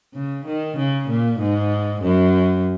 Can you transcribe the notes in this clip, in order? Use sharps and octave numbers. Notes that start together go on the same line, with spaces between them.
C#3
D#3
C#3
A#2
G#2
F#2